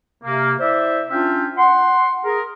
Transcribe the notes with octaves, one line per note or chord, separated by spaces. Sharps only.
C3 A#3
E4 C5 D5 E5
C#4 D4 F4 E5 F5 G5
F#5 C6
G#4 A#4